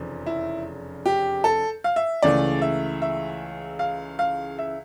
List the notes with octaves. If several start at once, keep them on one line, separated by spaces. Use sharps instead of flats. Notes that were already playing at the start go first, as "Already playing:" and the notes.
Already playing: F1 E2 C#3 F3
E4
G4
A4
F5
E5
C#2 C#3 E3 A3 D5
E5
E5
F5
F5
E5